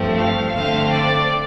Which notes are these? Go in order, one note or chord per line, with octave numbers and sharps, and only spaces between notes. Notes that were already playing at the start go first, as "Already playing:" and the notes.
Already playing: G2 F3 A3 C4
F5
D3 A3 C4 F5
D5